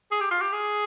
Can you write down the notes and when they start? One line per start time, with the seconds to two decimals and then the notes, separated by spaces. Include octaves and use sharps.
0.11 G#4
0.20 G4
0.31 F4
0.41 G4
0.53 G#4